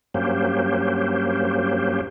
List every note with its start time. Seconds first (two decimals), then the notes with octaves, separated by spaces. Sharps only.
0.14 G2 F#3 A#3 C#4 G4 C5